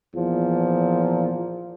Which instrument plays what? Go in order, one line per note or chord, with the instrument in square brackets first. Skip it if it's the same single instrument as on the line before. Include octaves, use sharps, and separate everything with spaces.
[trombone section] E2 A#2 F3